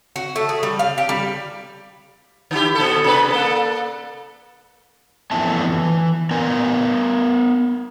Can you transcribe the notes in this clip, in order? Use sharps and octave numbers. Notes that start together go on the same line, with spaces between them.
F#4
A3
G#4
G3
F5
G4
G3
D3 E4 G4
A#2 A4
C3 B4
A#3 A4
F2 E3 A3 B3 E5 A5
E3
B3 A#4 G#5